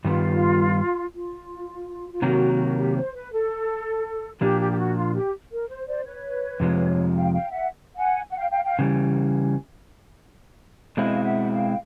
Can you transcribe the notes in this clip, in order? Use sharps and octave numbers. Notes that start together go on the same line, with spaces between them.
G2 D#3 G3 B3 F4
F4
F4
C3 D#3 F#3 A#3 F#4
G4
C5
B4
A4
A#2 F3 A#3 D4 G4
G4
G4
F#4
F4
G4
A#4
C5
C5 D5
B4 C#5
F2 C3 F3 G#3
F5 G5
F5 G5
E5 F#5
F#5 G#5
F#5
F5 G5
F5 G5
F5 G5
C#3 E3 G3
B2 G#3 C4 E4 D#5 F5
E5 F#5
F5 G5